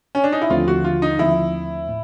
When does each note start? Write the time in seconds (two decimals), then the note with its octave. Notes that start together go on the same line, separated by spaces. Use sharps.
0.15 C#4
0.24 D4
0.32 D#4
0.42 E4
0.50 D#2 D3 F3 A3 C4 F4
0.68 F#4
0.84 F4
1.02 D#4
1.19 D#2 D3 F3 A3 C4 E4
1.88 A2